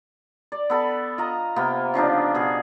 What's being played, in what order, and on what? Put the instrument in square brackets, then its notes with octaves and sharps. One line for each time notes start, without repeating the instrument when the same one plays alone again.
[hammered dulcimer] D5
B3 A4 B5
F4 D#5 A#5
C3 A#3 B3 G5
C#3 F3 D4 D#4
B2 G#4